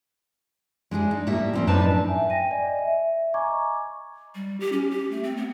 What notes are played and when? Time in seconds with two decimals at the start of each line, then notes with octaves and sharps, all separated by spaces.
0.91 G#3 D4 E4 G#4
1.11 D#4
1.27 A2 G3 A#3 E5
1.53 F2 C4 C#4
1.67 F#2 A2 D4 D#4 B4 A5
2.08 E5 G#5
2.30 G5 A#6 D#7
2.51 D5 D#5 G#5
2.79 E5
3.34 D#5 G#5 A#5 C#6 D6 G#6
4.35 G3
4.60 G4
4.73 C#4
4.90 G4
5.11 A3
5.23 C4
5.37 B3